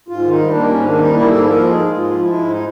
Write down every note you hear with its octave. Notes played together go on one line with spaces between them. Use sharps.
G#2 F4
D#3 D#4
G3
D4
A#3
G#2 C#4
D#3 D4
G3 D#4
A#3 E4
G#2 A4
F3 A#4
G#3
G#2 G#4
G#2 F4
F3
G#3 E4
G#2
D#4